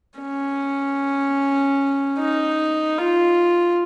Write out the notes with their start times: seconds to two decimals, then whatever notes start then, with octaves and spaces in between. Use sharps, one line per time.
0.20 C#4
2.18 D#4
2.98 F4